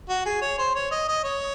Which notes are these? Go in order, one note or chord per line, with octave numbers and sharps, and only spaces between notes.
F#4
G#4
C#5
C5
C#5
D#5
D#5
C#5